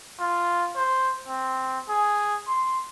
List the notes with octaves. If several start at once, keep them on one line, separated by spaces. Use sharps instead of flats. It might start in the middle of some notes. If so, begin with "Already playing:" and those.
F4
C5
C4
G#4
C6